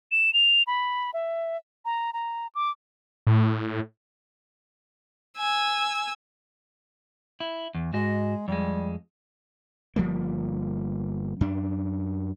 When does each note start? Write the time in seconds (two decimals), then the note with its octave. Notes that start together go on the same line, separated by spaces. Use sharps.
0.12 E7
0.34 F7
0.67 B5
1.14 E5
1.85 A#5
2.13 A#5
2.55 D6
3.27 A2
5.37 G#5 E6
7.40 E4
7.75 E2
7.93 G#2 G#3 F#4 D#5
8.48 F2 G3 G#3
9.96 G1 F3 G3 A#3
11.41 F#2 D4